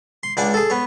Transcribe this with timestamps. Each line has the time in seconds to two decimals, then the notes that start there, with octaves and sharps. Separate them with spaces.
0.23 C6
0.37 C#2 D4 D5 F#5 G#5
0.54 G#4 A4
0.70 B3 C#5